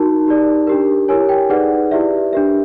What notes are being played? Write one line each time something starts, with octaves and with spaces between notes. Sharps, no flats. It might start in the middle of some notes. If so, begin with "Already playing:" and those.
Already playing: D#4 F#4 A#4 A5
D#4 G4 A#4 D5
D4 G4 A#4
E4 G4 A#4 C#5 G#5
G5
D#4 G#4 B4 D5 F#5
E4 G4 B4 D5 E5
D4 G4 A#4 E5